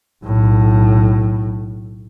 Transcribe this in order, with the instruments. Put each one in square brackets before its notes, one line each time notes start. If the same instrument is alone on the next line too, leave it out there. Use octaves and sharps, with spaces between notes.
[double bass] B1 A2